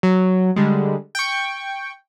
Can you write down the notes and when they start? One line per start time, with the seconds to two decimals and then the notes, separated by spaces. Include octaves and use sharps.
0.03 F#3
0.56 D3 G3 G#3
1.15 G5 C#6